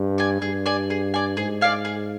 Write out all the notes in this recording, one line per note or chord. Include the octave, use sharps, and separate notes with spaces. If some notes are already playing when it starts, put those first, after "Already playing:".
Already playing: G2
D5 G#5
G2 G#4
D5 G#5
G#4
D5 G#5
G#2 G#4
D5 F5 G#5
G#4